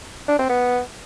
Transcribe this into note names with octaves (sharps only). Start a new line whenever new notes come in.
D4
C4
B3